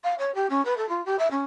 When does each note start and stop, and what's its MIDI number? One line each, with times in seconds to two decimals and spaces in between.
0.04 0.14 77
0.18 0.33 73
0.35 0.46 67
0.50 0.63 61
0.65 0.74 71
0.77 0.88 69
0.89 1.04 65
1.05 1.15 67
1.18 1.28 76
1.31 1.44 61